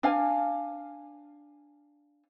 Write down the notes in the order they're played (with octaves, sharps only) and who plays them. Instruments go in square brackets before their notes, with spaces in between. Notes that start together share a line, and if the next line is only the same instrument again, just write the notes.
[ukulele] D4 F5 G#5